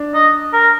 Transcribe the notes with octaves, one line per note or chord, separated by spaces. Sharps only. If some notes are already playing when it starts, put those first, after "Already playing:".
Already playing: D4
D#5
A#4